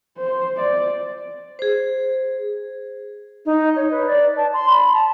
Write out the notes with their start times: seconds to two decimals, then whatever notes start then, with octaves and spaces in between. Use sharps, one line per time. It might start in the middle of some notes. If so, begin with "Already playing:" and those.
0.18 C5
0.57 D5
1.59 G#4 C5
3.46 D#4
3.76 C#5
3.91 B4
4.07 D5
4.37 A5
4.54 C6
4.70 B5
4.93 A5